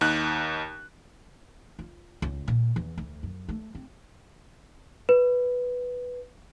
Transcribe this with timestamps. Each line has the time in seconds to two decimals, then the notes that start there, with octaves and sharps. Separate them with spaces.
0.01 D#2 D#4 F#6
1.79 F4
2.22 C#2
2.48 A#2
2.76 E2
2.97 D2
3.23 F#2
3.49 A3
3.75 C4
5.09 B4